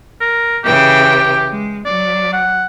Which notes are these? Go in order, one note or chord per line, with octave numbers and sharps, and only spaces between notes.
A#4
C#3 E3 G4 G5
G#3
F#3 D5
F#5